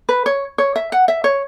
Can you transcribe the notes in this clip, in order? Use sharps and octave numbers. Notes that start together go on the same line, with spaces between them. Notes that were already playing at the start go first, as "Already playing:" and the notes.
B4
C#5
C#5
E5
F#5
E5
C#5